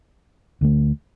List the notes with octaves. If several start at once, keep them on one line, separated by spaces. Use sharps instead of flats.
D2 D3 A3